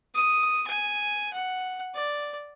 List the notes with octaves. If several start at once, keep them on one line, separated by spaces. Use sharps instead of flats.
D#6
G#5
F#5
D5